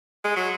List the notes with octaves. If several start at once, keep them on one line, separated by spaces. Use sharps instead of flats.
G#3
F#3